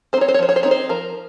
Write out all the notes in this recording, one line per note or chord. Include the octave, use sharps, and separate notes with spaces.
C4 D#4 C5 C#5
C5
C#5
F3 C5
C#5
C5
C4 D#4 C#5
C5
F3 A#4